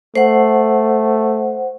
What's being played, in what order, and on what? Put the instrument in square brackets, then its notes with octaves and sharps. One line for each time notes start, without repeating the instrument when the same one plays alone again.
[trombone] A3 [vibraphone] C5 F#5